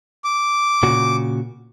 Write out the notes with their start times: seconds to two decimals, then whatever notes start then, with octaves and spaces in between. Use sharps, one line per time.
0.25 D6
0.83 A#2 C#3 F#4